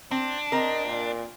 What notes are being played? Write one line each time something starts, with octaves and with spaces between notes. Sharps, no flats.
C4 D4
C4 A#4 D#5
A#2